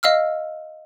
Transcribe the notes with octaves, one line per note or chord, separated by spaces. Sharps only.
D#5 F5 E6 F6